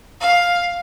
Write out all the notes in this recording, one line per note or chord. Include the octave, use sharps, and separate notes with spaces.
F5